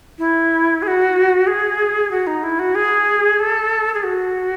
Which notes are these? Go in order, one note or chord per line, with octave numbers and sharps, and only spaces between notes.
E4
G#4
F#4
G#4
F#4
D#4
E4
F#4
G#4
A4
G#4
F#4